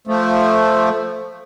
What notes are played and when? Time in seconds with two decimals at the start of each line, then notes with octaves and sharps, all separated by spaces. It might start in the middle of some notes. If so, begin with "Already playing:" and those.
0.07 F3 A3